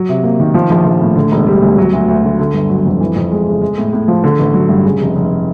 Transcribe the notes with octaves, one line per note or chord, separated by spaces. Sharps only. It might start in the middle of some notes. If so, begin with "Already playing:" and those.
Already playing: F#3
C3
A#3
D#3
F3
A#1
A#1
A2
D3
E1
G3
D2
F#3
D2
D2
D3
D3
G1
F#3
F2
E3
F2
G#3
C#3
G#3
A2
A2
F3
D3
A1
F#3
G2
C#3
F1
F1